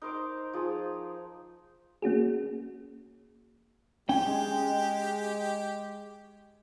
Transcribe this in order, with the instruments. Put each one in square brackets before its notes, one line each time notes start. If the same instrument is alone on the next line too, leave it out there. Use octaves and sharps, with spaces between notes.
[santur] D#4 A#4 C5 D6
F3 G#4
[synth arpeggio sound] A#3 C#4 F#4 G#4
[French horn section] G#3 [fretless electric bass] C#4 [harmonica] G4 [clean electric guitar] G5